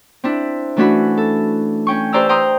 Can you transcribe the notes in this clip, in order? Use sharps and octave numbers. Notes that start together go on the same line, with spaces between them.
C4 D4 E4
E3 A3 C#4 D4 F#4 B5
A4
C#4 G5 C#6
G4 B4 C5 D5 A#5 E6
G5 A#5 C6 D#6